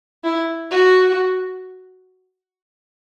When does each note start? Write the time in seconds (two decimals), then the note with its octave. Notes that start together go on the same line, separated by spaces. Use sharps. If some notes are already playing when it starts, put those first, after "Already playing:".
0.24 E4
0.71 F#4